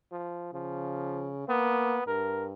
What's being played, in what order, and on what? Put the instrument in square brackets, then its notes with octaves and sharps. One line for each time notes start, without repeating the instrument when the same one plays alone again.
[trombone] F3
[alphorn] C#3 [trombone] F3
[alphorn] A#3 [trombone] B3
[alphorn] G2 [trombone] A#4